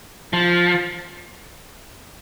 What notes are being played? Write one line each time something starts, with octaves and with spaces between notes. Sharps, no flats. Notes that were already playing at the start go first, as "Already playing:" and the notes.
F3